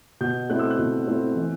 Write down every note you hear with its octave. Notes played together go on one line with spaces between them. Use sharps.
B2 G6
A3 C4 E4 F#6
E6
F#6
B2
A3 C4 E4
E3